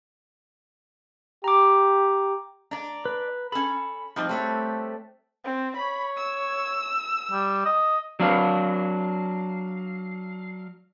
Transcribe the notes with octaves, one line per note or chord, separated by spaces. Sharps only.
G4 A#5 D6
D4 D5 A#5
B4
C#4 A4 B5
F3 G3 C4 D#4
G3 A3 A4 B4 C#5
C4
C#5 B5
E6
G3
D#5
F#3 D4 F5